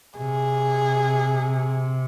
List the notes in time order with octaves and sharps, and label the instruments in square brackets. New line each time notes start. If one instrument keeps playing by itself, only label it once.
[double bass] C3 [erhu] G#4